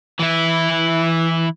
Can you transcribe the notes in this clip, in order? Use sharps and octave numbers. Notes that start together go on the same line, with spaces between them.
E3 E4